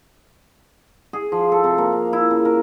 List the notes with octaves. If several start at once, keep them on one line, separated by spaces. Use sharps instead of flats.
G#4
F3
A4
C3
A#3
F5
E4
C#3
A#4